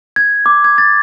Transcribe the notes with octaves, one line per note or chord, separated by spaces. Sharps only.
G#6
D6
G#6
A6